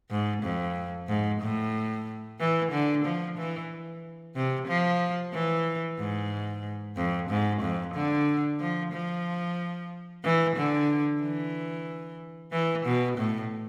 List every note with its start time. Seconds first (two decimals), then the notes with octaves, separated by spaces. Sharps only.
0.11 G#2
0.43 F2
1.09 G#2
1.41 A2
2.40 E3
2.72 D3
3.05 F3
3.38 E3
4.36 C3
4.68 F3
5.33 E3
5.99 G#2
6.97 F2
7.30 G#2
7.62 F2
7.94 D3
8.60 F3
8.93 F3
10.24 E3
10.56 D3
11.22 E3
12.52 E3
12.86 B2
13.18 A2